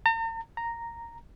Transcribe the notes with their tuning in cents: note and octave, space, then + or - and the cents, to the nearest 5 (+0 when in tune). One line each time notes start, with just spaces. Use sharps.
A#5 -45
A#5 -5